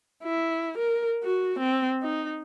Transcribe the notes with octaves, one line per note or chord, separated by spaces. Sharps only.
E4
A#4
F#4
C4
D#4